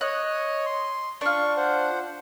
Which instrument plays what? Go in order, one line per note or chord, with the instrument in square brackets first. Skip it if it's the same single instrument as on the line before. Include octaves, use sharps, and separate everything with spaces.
[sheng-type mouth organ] C#5 D#5 [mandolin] F#6
[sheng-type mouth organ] C6
[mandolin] D4 F4 [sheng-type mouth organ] C#6
[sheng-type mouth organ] C5 F#5